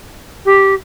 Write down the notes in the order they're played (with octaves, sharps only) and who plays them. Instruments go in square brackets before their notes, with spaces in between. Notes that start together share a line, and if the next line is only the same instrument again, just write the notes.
[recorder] G4